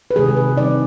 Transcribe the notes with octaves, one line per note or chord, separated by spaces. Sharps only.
B4
C3 D#3 G#3 G#4
G#4
B4
D#3 G3 C4 D#4 D5